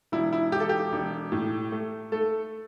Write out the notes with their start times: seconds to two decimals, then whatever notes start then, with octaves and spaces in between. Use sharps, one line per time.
0.12 E1 E4
0.33 E4
0.52 E1 G4
0.60 A4
0.69 G4
0.92 E1
1.32 A2
1.72 A3
2.12 A3 A4